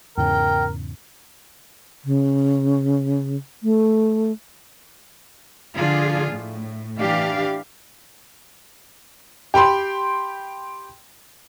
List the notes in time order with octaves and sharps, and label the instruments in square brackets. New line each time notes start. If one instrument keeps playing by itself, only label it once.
[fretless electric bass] E2 G#2 C#3 [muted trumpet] A#4 [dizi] G5
[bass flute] C#3
A3
[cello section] D3 F3 D4 F4 G#4
A2
E3 D4 G4 F5
[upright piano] G4 G5 B5 C6